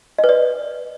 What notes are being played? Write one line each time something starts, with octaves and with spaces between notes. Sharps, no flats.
D#5
B4
D5